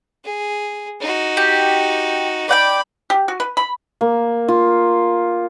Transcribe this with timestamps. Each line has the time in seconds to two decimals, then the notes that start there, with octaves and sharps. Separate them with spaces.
0.24 G#4
1.01 D#4 F#4
1.37 G4
2.49 D5 F#5 G5 B5
3.10 G4
3.28 F#4
3.40 B4
3.57 B5
4.01 A#3
4.48 F4